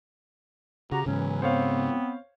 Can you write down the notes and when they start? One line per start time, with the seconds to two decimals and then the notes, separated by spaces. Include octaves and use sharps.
0.92 C#3 F#4 G4 A#5
1.06 G#2 C#3 E3 F#3 C#4
1.42 B3 C4 C5 C#5 F5